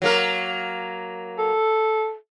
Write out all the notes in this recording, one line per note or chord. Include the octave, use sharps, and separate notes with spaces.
F#3 A#3 A#4
A4